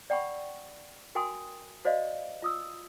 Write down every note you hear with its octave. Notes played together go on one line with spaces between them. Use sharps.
D5 F#5 G5 B5 C#6
F#4 A#4 G5 G#5 C6 D#6
F#4 C5 D5 D#5 F5
F4 D#6 E6